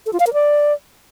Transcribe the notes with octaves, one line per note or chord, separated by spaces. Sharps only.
A4
F4
F5
A#4
D5